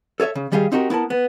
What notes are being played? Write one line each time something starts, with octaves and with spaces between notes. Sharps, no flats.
A4 C#5 D#5 E5
C#3
D#3 G3 G4 G#4 F5
C4 D#4 F#4 G4 A#4
B3 E4 A#4 A5
B3